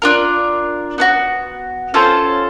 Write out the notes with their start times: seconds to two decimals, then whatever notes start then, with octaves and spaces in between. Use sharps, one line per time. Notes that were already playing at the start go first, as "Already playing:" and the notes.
0.02 D4 F4 A#4
0.98 B3 D4 F#4
1.94 C#4 F4 A4 C5